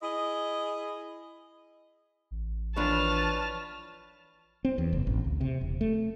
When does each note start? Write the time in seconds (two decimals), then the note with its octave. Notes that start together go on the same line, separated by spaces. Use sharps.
0.03 E4 G#4 D#5
2.31 A1
2.76 E3 F3 D4 B4 C#5 A5 F6
4.65 C4
4.78 E2
4.93 F#1
5.07 A1
5.24 D2
5.41 C3
5.61 E1
5.81 A3